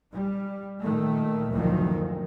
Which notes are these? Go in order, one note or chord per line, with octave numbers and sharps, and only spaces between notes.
G3
A#2 D#3 A3
F#1 D2 D#3 F3